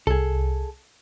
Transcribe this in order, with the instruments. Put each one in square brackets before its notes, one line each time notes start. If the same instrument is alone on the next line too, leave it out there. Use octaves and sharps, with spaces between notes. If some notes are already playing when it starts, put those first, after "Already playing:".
[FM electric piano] C2 [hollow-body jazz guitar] G#4 A4